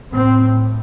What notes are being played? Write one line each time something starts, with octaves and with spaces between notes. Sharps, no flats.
A2 C4